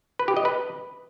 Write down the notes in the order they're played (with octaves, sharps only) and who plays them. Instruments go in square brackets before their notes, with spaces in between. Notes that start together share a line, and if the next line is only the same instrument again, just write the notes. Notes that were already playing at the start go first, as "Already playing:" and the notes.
[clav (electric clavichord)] B4
G4
D#5
B4